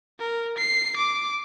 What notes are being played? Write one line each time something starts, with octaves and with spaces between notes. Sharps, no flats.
A#4
C7
D6